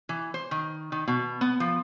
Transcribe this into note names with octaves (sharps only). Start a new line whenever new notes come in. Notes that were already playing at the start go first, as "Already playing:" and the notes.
E3
C5
D#3
D#3
B2
B3
F3